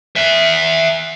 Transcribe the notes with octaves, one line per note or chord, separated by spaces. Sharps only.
E5 F#5